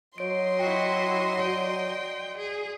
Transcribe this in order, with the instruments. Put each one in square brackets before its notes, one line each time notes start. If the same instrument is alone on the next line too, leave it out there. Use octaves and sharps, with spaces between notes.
[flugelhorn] F#3 [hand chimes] C#5 D7 [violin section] D#5 C6
[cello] E4 F#4 [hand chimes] G5
[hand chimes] F#4 D5 [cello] G5
[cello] G#4